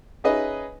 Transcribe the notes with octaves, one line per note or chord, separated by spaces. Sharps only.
C#4 D#4 G#4 B4 D#5 E5